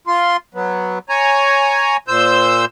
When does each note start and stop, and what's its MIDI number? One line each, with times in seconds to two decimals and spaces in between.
0.07 0.37 65
0.07 0.37 84
0.54 0.99 54
0.54 0.99 59
1.09 1.97 73
1.09 1.97 80
1.09 1.97 82
2.08 2.65 46
2.08 2.65 72
2.08 2.65 88
2.08 2.65 91